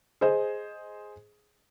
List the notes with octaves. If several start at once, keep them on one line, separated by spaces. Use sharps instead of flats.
G#4 C5 D#5